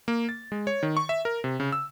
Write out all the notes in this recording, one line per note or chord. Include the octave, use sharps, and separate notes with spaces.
A#3
A6
G#3
C#5
D#3
C#6
E5
A#4
C3
C#3
E6